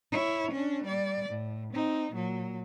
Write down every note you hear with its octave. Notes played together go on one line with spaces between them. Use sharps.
E4 C#5
C#4 D4
G3 D5
A2
C4 D#4
A#2 F#3